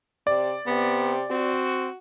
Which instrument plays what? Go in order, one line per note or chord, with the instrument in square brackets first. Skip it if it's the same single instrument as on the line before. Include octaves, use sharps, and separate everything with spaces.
[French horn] C3 [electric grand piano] D5
[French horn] C3 [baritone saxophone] B3
[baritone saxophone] C4 [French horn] F#4